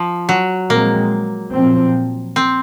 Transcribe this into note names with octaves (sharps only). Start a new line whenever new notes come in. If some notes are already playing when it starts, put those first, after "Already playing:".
Already playing: F3
F#3
A#2 F3 G#3 A#3 C4
A#2 F3 C4
C4